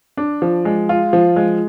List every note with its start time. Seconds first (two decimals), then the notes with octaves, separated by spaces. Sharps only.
0.17 D4
0.42 F3
0.65 G#3
0.89 F4
1.13 F3
1.36 G#3